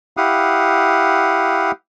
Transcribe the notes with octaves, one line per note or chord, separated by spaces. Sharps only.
E4 G4 F5 F#5 D#6